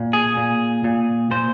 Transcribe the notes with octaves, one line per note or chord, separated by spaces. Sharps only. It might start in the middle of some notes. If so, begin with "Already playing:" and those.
Already playing: A#2
G#4
A#2
A#2
A#2 C5